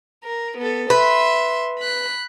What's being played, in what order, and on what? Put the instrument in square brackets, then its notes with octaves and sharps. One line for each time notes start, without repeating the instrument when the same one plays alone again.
[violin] A#4
B3 A4
[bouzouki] B4 [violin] E5 C6
[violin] B5 F#6